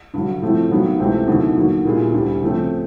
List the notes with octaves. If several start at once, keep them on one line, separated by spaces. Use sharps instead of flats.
G2 D3 F#3
A2 F3 A3 C4
G2 D#3 F#3 B3
C#2 C3 E3 A3 C4
D#2 D3 F#3 B3 E4
D#2 D3 F#3 A#3
A#2 G3 B3 E4 G#4
D2 D3 G3
C#3 F3 A3 C4